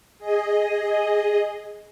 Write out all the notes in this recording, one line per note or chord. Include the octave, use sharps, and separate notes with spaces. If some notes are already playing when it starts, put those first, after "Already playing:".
G#4 D#5